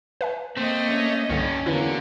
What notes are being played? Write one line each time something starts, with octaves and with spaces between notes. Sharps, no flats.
B4 E5 G#5
A3 A#3 C4 D#5
C#4
C2 G2 D3 C#4
E2 D3 F#3 A#3 E4 B4 D5